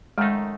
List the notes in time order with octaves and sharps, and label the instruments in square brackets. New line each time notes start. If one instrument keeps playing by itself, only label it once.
[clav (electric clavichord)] F#2 D#3 A3 D#4 [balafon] G#3